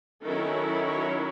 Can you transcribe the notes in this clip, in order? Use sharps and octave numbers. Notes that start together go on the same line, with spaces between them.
D#3 F#3 C#4 E4 A4
C#5